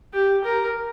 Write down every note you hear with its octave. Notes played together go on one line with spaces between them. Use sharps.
G4
A#4